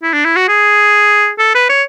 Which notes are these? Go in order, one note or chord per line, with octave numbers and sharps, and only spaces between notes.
E4
D4
E4
F#4
G#4
A4
B4
C#5